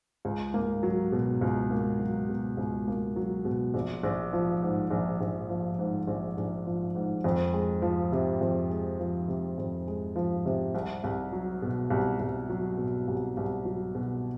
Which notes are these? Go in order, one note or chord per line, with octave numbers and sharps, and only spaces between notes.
C#2
A#3
F#3
B2
C#2
A#3
F#3
B2
C#2
A#3
F#3
B2
A#1
A#1
F3
G#2
A#1
A#1
F3
G#2
A#1
A#1
F3
G#2
F2
G#3
F3
C3
F2
G#3
F3
C3
F2
G#3
F3
C3
C2
C2
F#3
B2
C2
C2
F#3
B2
C2
C2
F#3
B2